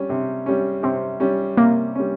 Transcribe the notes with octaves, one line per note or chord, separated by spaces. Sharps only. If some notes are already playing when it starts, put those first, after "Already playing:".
Already playing: G3 C#4
C3
G3 C#4
C3 C4
G3 C#4
C3 A#3
G3 C#4